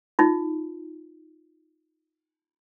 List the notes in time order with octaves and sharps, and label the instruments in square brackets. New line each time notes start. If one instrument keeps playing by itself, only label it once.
[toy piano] D#4 F4